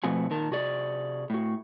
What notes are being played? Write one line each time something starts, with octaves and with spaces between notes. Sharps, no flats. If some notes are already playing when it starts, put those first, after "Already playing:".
B2 F3 A3 C4 F#4 G#5
A#2 D#3 A#4 A5
C3 F#4 G#4 D5
A2 F#4